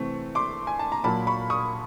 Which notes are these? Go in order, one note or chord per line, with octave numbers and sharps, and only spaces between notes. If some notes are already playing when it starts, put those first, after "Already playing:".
Already playing: C3 E3 A3 C4 C#6
C6 D6
G#5
A5
A#5
A#2 F#3 A#3 A5 B5
B5 C#6
C#6 D#6